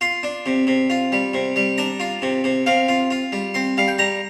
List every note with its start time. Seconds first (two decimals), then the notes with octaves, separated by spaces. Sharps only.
0.01 F4 C6
0.23 D4
0.46 C3
0.67 C3
0.90 F4
1.12 G3
1.33 C3
1.56 G3
1.78 D4 A#5
2.00 F4
2.22 C3
2.44 C3
2.66 C3 F5
2.88 F4
3.11 F4
3.32 G3
3.54 C4 C6
3.78 G3 F5
3.88 G5
3.98 G3 A#5